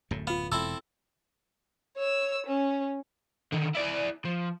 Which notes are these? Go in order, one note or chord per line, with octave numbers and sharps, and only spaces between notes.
D1 F#2 A2
B3 F4 F5
E1 C4 E4 A4 E6
C#5 E6
C#4
D3 D#3
E4 D5
F3